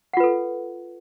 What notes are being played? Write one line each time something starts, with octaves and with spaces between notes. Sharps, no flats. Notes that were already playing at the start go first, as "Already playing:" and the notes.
F4 A4 B4 F#5